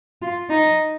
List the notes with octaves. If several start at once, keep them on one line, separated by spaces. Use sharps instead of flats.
F4
D#4